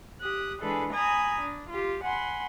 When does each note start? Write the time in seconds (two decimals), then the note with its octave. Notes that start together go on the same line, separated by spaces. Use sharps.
0.21 G4 D#6 F#6
0.61 E3 G#3 D4 G#4 A4 B4
0.92 G#5 A#5 B5 D#6 G#6 A#6
1.40 D4
1.69 F4 G4
2.03 F#5 G#5 B5 C6